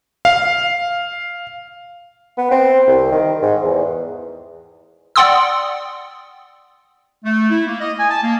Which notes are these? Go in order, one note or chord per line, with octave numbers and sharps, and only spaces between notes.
F5
B3
C4
C2
D#3
G#2
E2
D5 F#5 G5 C6 D#6 E6
A3
E4
A#3
D#5
G#5
A5
A#3